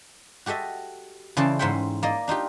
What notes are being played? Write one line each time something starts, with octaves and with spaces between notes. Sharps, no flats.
F#4 G4 A4 D#5 E5
C#3 E3 A4 C5 D5 A5
G#2 C#4 C5 E5 F#5 G5
A#3 D5 D#5
D4 D#4 F4 G4